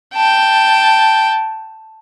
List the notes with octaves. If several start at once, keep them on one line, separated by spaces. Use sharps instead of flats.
G5 A5